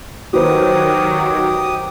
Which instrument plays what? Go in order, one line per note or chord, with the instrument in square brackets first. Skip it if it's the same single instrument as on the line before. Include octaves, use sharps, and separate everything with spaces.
[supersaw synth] D#3 F#3 [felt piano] F#4 B4 C5 [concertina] G4 D#6